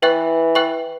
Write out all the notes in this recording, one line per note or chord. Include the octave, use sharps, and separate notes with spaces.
E3 B4 E5 G5 C#6 F#6
B4 E5 G5 C#6 F#6